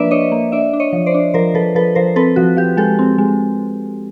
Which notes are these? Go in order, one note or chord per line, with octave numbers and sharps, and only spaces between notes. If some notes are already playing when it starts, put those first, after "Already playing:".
Already playing: F3 A#3 D4 B4 D5 E5
D4 C#5 D#5
A#3
D4 D5 E5
D4
C#5 D#5
F3
C5 D5
D4
F3 A#4 C5
F3 A4 B4
F3 A4 B4
F3 A#4 C5
C4 A4 B4
F3 F#4
F3 G4
G#3 G4 A4
C4
G#3